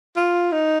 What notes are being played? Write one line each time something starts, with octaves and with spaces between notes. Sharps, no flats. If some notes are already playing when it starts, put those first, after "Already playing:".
F4
D#4